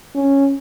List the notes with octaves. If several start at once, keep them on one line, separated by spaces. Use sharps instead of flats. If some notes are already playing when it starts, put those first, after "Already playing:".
C#4